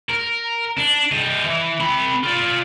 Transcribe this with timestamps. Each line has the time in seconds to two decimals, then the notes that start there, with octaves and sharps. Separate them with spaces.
0.09 A#4
0.77 D4
1.12 G3 D#5
1.44 E3
1.80 C4 B5
2.23 F4 D5